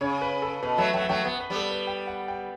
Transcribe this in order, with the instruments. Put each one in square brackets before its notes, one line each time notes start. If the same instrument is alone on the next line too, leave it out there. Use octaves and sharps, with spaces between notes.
[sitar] C#3 [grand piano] C#5
[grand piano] B4
A4
[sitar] B2 [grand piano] B4
[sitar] F#3 A3 [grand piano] E5
[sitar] F#3 A3 [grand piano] G5
[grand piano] F#5
[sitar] F#3 A3 [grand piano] G5
[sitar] B3 [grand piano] F#5
[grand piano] B4
[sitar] G3 B3
[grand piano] A4
B4
G5
F#5
G5